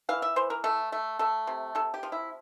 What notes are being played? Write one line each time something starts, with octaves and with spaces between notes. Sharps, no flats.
E3 F5
E5
E3 C5
A#4
A3 A4
A3
A3 A4
C3
C3 A4
G4
F3
E4